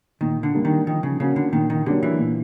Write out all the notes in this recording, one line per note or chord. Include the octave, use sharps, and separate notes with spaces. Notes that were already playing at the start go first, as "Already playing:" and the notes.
A#2 D#3
D3
G3 A#3 D4
D#3
D#3 F3
C#3
C#3 A#3 C#4 F#4
D3
A#2 D#3
D#3
D3 F#3 A#3 D4 G4
E3
A#2